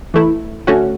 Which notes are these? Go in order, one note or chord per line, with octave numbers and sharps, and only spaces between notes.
E3 A3 E4
D3 A3 C#4 F#4